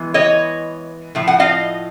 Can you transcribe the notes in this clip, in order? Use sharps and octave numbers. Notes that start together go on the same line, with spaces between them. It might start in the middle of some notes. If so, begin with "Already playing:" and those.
Already playing: E3 G#3 B3
C#5 D#5
A2 F3
F#5
D#5 F5